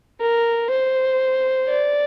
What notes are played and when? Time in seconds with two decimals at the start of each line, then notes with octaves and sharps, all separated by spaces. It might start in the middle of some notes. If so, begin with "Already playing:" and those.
0.21 A#4
0.70 C5
1.69 D5